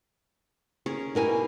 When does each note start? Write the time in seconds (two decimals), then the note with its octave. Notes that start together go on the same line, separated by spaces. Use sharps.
0.86 C#4 G#4 A#4
1.15 B2 G3 D#4 E4 A#4 G#5